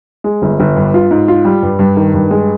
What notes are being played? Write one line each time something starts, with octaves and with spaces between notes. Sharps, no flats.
G#3
G1
G1
G2
F4
G#2
F4
G3
G2
G2
D#3
G2
G#3